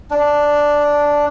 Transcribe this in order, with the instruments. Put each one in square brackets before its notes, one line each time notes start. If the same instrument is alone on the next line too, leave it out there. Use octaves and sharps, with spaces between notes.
[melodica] D4